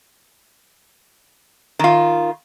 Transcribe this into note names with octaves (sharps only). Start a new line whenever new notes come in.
D#3 F4